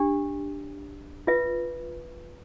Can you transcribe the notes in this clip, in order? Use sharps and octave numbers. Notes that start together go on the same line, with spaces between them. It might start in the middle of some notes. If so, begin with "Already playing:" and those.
Already playing: D4 G4
F4 B4 E5